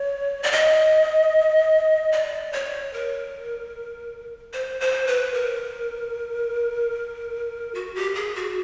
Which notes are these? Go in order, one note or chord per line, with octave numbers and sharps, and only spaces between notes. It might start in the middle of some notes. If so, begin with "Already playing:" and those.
Already playing: C#5
D5
D#5
D5
C#5
A#4
C5
C5
B4
A#4
F#4
G4
G#4
F#4